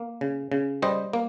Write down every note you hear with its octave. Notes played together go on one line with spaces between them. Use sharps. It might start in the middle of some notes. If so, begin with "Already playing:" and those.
Already playing: A#3
C#3
C#3
G3 C5 D#5
A#3